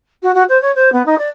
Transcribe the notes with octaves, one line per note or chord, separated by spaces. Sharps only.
F#4
F#4
C5
C#5
C5
B3
D#4
D5